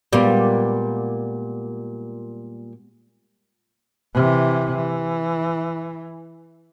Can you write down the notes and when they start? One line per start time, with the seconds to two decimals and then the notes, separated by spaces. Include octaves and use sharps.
0.13 A#2 G3 G#3 B3 F4 D5
4.14 C3 E3
4.76 E3